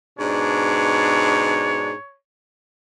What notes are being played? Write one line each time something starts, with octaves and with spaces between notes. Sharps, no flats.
G#2 B2 D4 C#5